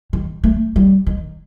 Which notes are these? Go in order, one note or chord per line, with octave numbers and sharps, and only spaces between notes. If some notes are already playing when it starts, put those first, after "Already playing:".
D#3
A3
G3
D#3